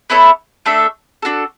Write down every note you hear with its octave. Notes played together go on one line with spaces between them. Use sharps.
B3 E4 A4 C#5
A3 D4 A4 E5
D4 F#4 A4